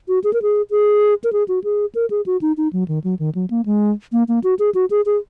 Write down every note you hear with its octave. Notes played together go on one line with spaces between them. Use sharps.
F#4
G#4
A#4
G#4
G#4
A#4
G#4
F#4
G#4
A#4
G#4
F#4
D#4
D#4
F#3
D#3
F#3
D#3
F#3
A#3
G#3
A#3
A#3
F#4
G#4
F#4
G#4
G#4